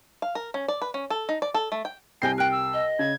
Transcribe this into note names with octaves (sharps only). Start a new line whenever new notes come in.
F5
A#4
C#4
D5
B4
C#4
A4
D#4
D5
A4
A3
G5
C2 C5 D#5 G5 G#5 C7
A#4 G5 F#6
E6
D#5
C#3 G#6